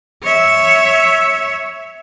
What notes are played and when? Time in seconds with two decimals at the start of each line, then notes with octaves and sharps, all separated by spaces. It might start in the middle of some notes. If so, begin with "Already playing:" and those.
0.23 C#5 E5